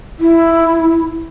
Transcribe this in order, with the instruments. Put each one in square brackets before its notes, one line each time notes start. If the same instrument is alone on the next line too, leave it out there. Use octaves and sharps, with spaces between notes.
[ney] E4